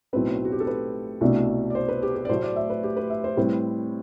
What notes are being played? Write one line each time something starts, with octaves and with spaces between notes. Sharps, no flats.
B1 A2 F#3 A3 C4 B4
F#4
G4
A4
B4
C2 B2 A3 D4
D5
C5
B4
G4
G4
D5
A2 F#3 A3 E4 C5
D5
E5
B4
G4
B4
E5
C5
A2 G3 C4 B4